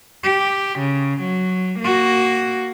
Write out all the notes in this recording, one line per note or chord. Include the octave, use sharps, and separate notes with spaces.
G4
C#3
F#3
A#3 F#4